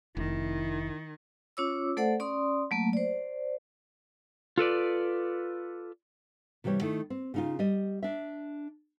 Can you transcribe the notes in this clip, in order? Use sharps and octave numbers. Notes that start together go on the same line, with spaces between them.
F1 D#3 E4
C#4 F4 C#5 D6 E6
A3 A4 C5 D5 F#5
C#4 D5 C6 D#6
F#3 A3 A#3
C5 D5
F4 A4 B4 D5
C3 E3 G3 G4 C#5
D#3 A3 E4
C4
C#3 D#4 F4
G3 D#5
D4 E5